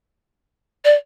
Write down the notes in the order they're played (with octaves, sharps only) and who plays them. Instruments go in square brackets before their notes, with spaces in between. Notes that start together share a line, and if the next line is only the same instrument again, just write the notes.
[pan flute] D5